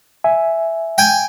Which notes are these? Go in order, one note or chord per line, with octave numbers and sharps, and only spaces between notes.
E5 G#5
G5 G#5